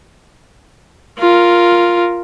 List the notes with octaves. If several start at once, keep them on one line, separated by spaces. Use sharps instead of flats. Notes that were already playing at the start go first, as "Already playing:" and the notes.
F4 A#4